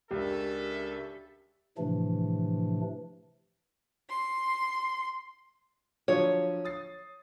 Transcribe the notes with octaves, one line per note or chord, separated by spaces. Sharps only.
C#2 C#4 D4 G4 A4 A#4 D5 E5
A2 C3 E3 F3 A3 D4
C6
D3 F3 F#3 C#5
D#6 A6 C7